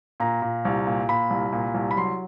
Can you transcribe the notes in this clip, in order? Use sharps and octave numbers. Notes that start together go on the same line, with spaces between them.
A#2 A#5
A#2
C2
A#2
A#2 B5
C2
A#2
C2
B5
F#3 C6